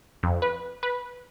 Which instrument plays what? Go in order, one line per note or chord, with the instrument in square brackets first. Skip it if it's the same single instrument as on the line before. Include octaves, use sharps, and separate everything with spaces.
[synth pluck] F2
B4
B4